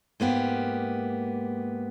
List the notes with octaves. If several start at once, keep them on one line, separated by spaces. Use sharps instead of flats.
G#2 A#3 B3 G4